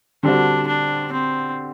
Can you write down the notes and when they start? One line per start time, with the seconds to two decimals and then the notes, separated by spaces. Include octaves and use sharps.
0.23 D3 G3 C4 D4 F#4
0.68 D4
1.12 C4